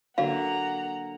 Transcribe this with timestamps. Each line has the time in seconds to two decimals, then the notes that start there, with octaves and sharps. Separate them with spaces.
0.18 D3 F#3 A#3 F5 F#5 A#5